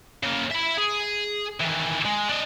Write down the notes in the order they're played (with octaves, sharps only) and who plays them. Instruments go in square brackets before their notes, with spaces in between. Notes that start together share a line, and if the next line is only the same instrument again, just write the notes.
[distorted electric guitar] C#3 A#3
E5 B5
G#4
D#3 E3
G#3
D4 D#5